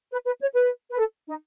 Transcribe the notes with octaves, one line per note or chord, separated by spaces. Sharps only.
B4
B4
C#5
B4
B4
A4
D#4